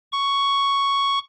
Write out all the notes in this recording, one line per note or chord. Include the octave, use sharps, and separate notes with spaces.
C#6